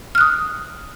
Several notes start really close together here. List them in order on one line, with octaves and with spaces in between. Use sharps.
F6 F#6 D#6